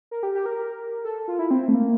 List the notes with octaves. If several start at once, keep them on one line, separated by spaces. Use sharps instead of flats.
A#4
G4
G4
A#4
A4
F4
E4
C4
A3
A#3